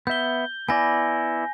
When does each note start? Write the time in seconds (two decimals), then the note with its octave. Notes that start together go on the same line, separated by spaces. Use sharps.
0.07 B3 E5 G6 G7
0.69 B3 E4 D5 G#5 A#6